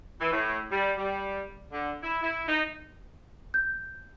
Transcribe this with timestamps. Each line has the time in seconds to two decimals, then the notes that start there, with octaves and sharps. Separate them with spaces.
0.21 E3
0.33 A2
0.71 G3
0.98 G3
1.72 D3
2.03 E4
2.23 E4
2.47 D#4
3.54 G6